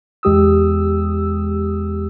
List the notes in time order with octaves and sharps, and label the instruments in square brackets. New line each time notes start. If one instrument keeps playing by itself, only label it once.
[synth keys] E2 G#3 G4 D#6 E6